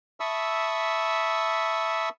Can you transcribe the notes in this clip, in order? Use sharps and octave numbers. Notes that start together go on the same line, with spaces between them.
E5 A5 B5 C#6 D#6 E6